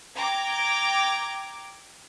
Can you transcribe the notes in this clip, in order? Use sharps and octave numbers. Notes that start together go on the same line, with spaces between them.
G5 A#5 D6 G#6